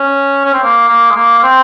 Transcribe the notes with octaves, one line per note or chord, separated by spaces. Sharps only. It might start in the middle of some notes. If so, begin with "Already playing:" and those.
Already playing: C#4
C#4
C4
A#3
A#3
G#3
A#3
A#3
C4